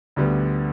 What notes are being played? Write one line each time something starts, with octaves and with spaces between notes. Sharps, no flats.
D2 D3 G3 B3